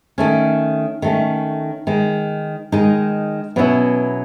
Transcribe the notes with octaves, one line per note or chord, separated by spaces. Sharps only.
D#3 A3 C#4
D#3 A3 C#4
D#3 G#3 D#4
D#3 G#3 D#4
B2 F#3 C#4 E4